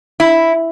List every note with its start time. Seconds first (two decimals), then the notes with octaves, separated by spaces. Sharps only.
0.20 E4